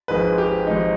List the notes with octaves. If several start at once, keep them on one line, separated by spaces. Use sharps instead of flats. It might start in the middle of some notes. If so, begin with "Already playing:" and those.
G#1 G#2 F3 G#3 B4
G4
G#1 G#2 F3 D#4